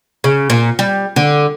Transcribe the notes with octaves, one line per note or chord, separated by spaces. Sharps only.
C#3
A#2
G3
D3